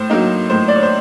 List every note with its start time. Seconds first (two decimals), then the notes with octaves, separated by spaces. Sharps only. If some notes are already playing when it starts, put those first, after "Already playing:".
Already playing: A2 C5
0.10 F#3 A#3 D#4
0.50 A2 C5
0.68 D5
0.76 C#5
0.83 C5